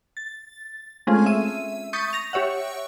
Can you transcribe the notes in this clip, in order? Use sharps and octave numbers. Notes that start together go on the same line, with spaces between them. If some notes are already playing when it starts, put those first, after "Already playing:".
A6
G#3 A3 C4 C#4 F4 G#4
E5 D#7
C#6 D#6 G6 A6 B6
A#6 F7
G4 C#5 E5 F#5